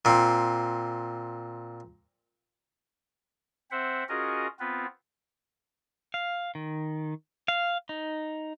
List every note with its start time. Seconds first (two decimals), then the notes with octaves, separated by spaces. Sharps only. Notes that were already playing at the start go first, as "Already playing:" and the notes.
0.05 A#2 C4
3.71 C4 C5 E5 F#5
4.09 C#4 F4 F#4 G#4 A#4 D#5
4.60 B3 C4 F4 B4
6.14 F5
6.55 D#3
7.48 F5
7.89 D#4